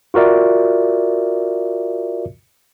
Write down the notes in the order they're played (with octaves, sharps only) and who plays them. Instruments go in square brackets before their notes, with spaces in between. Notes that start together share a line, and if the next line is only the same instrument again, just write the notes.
[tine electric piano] F4 F#4 A#4 D5 E5